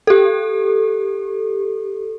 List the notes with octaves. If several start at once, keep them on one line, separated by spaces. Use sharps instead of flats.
G4 A4